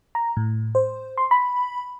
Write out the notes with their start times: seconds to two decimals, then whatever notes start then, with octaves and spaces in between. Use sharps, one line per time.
0.15 A#5
0.37 A2
0.75 C5
1.18 C6
1.31 B5